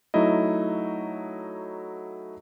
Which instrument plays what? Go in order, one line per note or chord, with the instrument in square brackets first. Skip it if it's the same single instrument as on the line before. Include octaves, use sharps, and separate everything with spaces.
[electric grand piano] F#3 A3 D#4 E4 D#5